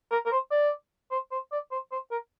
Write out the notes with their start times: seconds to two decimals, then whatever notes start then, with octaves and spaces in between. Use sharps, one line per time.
0.11 A#4
0.26 A#4
0.32 C5
0.51 D5
1.11 C5
1.32 C5
1.52 D5
1.71 C5
1.91 C5
2.11 A#4